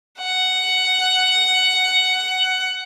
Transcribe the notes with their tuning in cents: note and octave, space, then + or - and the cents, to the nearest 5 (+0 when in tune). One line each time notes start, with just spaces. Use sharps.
F#5 +10